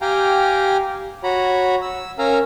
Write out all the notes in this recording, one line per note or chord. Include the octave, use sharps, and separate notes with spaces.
G4 F5 G5 G#5 A#5
F#4 C#5 A#5 B5
E6
C#4 A#4 F5 G#5 A#5 E6